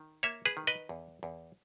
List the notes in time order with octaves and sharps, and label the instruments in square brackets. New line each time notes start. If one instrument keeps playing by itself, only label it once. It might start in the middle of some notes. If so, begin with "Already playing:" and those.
Already playing: [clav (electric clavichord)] D#3
A#3 C#5 E5
G#4 B4
D#3
B4 D#5
E2
E2